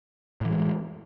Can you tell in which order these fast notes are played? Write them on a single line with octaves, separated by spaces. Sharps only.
A2 E3 G#3